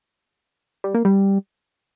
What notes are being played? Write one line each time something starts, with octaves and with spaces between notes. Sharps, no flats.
G3
A#3
G3